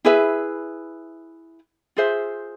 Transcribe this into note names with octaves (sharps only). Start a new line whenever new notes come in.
E4 G#4 B4 E5
F4 G#4 C5 E5